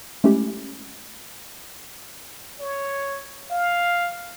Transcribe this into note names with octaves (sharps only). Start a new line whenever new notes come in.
G#3 A3 C#4 E4 G4
C#5
F5